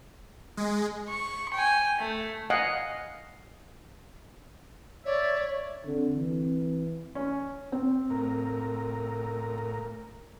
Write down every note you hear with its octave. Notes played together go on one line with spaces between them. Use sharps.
G#3
C#6
G5 G#5
A3
D#5 F5 F#5 G#5
C#5 D5 E5
D3 C4
E3
C#4
C4
A2 A#4